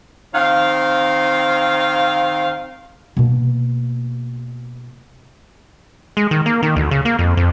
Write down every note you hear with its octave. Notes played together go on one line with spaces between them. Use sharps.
D#3 C4 F5
B2 A#3
G#3
D#3
A#3
D#3
D2
C#3
A#3
F2
F2